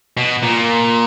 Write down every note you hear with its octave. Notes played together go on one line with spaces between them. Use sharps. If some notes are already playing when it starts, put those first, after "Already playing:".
B2
A#2